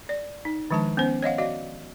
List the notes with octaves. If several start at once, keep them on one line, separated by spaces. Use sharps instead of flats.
D5
D#4
D#3 F3 G#3 D4 A5
B3 C#4 C5
C#5 D#5 F5 F#5
F#4 D5 D#5 F5